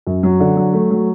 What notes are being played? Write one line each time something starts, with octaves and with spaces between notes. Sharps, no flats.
F#2
F#3
D3
F#3
A3
F#3